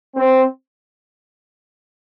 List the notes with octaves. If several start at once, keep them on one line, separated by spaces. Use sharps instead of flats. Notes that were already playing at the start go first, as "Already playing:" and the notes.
C4